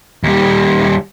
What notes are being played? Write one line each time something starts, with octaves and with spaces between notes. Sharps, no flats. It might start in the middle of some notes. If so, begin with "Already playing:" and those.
D#2 G3